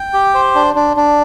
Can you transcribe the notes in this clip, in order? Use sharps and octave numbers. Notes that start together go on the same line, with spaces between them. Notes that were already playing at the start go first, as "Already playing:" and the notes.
Already playing: G5
G4
C5
D4
D4
D4